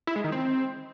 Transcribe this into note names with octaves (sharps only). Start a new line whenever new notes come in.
E4
G#3
D#3
C4